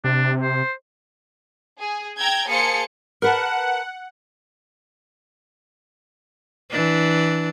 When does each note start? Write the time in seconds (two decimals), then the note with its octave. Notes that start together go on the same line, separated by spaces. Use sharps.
0.04 C3 D4
0.42 C5
1.79 G#4
2.18 G5 A#5 E6 G6 G#6
2.48 A#3 G#4 C5 F5 A5 C#7
3.22 A#4 B4 F#5 A5
6.71 E3 D4